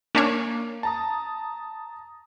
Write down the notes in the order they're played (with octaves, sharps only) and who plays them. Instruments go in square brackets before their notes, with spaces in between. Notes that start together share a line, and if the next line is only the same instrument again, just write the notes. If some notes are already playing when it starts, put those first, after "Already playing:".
[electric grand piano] A#3 [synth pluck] C#4 D4 C#5
[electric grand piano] A5 A#5 D#6